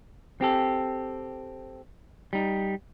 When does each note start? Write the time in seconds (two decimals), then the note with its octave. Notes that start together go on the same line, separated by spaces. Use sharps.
0.41 C4 G4 A4
2.33 G3 D#4